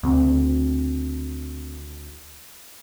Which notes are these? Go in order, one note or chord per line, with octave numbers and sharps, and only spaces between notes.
D2 C#3 C4